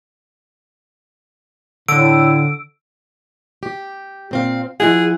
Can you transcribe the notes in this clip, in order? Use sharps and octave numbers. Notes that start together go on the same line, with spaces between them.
A2 D3 E6 D7
G4
A#2 C4 F5
F3 E4 G#4 F#5